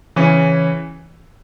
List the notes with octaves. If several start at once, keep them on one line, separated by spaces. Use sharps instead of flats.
C#3 E3 C#4